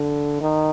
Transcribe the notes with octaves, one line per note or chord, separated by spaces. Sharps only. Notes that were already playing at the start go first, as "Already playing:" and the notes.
Already playing: D3
D#3